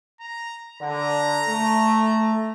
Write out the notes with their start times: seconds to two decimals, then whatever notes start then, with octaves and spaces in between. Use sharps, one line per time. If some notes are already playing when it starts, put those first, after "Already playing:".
0.20 A#5
0.80 D3 A#5
1.47 A3